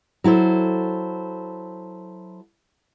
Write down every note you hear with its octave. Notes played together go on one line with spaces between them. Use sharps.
F#3 E4 A4 C5